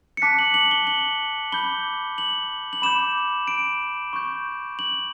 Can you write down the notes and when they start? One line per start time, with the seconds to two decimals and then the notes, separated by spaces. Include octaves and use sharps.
0.17 C#7
0.22 A5 D6 F#6 B6
0.39 F#7
0.54 F#7
0.71 G7
0.87 F#7
1.52 B5 D6 G6 G7
2.18 F#7
2.73 F#7
2.82 B5 D6 G6 E7
3.48 D7
4.13 C#6 G6
4.79 F#7